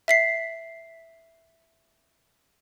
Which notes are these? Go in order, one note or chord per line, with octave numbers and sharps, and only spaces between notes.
E5 B6 C7